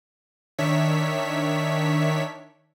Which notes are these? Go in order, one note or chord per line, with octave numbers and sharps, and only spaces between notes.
D#3 D4 C#5 E5 B6